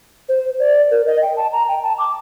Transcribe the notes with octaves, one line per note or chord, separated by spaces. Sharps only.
C5
D5
A#4
D#5
G5
A5
A#5
G5
A5
D6